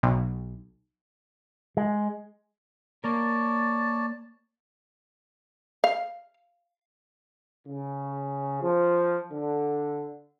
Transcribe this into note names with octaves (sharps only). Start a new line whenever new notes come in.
B1
G#3
A#3 A#4 C#5 D5 A5
F5
C#3
F3
D3